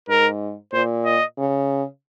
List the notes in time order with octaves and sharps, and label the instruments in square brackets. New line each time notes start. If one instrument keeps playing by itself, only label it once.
[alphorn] G#2 [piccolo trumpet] A#4
[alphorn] A#2 [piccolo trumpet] C5
[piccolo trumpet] D#5
[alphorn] C#3